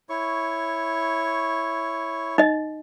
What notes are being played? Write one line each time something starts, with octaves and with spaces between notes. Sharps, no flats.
E4 C#5 C#6
D#4 D#5